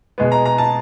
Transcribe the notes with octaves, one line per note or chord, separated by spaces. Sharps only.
B2 G#3 B3
A#5
A#5
A5